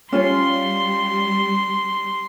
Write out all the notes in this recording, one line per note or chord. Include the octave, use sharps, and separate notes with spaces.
G3 C#4 F4 C#5 C6